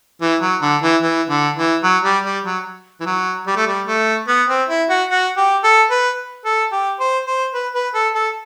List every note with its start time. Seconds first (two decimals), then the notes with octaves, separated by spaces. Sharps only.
0.22 E3
0.42 F#3
0.62 D3
0.82 E3
1.03 E3
1.30 D3
1.56 E3
1.84 F#3
2.04 G3
2.25 G3
2.45 F#3
3.00 E3
3.06 F#3
3.47 G3
3.56 A3
3.67 G3
3.87 A3
4.28 B3
4.49 C4
4.69 E4
4.90 F#4
5.10 F#4
5.37 G4
5.64 A4
5.91 B4
6.45 A4
6.72 G4
7.00 C5
7.26 C5
7.54 B4
7.75 B4
7.94 A4
8.15 A4